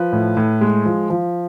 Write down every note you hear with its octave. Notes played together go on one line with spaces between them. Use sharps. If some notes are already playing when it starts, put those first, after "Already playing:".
Already playing: F3 B4
A2
A2
G#3
F3
F3